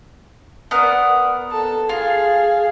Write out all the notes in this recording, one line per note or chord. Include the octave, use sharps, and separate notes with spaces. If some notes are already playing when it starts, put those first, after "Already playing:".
B3 A#4 D5 F#5
A4 A5
F4 G#4 F5